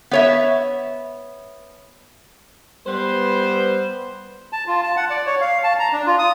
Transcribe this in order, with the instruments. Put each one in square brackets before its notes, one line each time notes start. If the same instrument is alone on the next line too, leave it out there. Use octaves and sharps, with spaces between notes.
[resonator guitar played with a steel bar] B3 C#5 E5
[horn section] G3 B3 B4 C5
[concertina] A5
F4
A5
F#5
D5
C#5
F5
A5
A#5
D4
F4
D#6